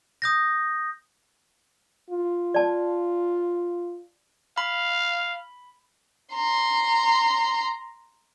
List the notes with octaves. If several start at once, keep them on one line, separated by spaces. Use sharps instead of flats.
D#6 G6 A#6
F4
D5 A5
F5 B5
A#5 C6